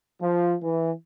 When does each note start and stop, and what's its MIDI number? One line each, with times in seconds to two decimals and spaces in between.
0.22 0.56 53
0.63 0.93 52